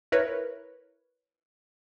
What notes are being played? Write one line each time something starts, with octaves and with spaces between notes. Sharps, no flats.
E4 A#4 B4 C#5